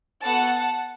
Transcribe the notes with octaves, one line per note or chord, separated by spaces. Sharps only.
B3 F#4 A4 F#5 A5